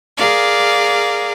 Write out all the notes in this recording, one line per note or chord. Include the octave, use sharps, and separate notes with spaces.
G#4 A#4 D5 F5